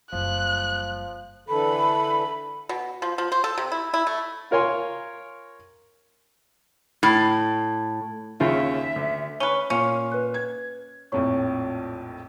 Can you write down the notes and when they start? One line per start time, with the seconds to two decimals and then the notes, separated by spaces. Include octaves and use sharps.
0.13 F#1 F3 G3 F#6
1.49 D3 E3 A4 B5
2.69 B2
3.02 F3
3.18 F3
3.32 C5
3.44 A4
3.58 C3
3.72 E4
3.94 E4
4.07 A3
4.51 F4 A#4 C#5 G#5 C6
7.03 A2
8.40 D#2 C#3 F4 E5
8.96 D2
9.40 C#4 B4 G7
9.70 A#2 C#4 F5
10.12 B4 F#6
10.34 G#6
11.12 A#1 F2 A2 C#5 C#6